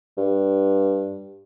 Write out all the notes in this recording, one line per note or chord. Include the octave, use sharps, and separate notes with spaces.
G2